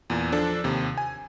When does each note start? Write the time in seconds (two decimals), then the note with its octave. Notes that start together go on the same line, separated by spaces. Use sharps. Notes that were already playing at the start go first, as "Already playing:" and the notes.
0.10 E2 A#2
0.32 F3 D4 A4
0.64 D#2 C3
0.98 G#5